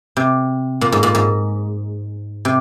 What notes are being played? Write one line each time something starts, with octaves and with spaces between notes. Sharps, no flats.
C3
A#2
G#2
A#2
G#2
C3